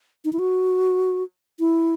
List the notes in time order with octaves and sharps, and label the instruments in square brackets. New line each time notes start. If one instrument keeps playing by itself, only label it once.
[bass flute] D#4
E4
F#4
E4